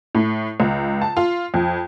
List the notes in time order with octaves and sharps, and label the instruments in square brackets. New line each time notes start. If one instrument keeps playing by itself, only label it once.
[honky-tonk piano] A2
C#2
A5
F4
F2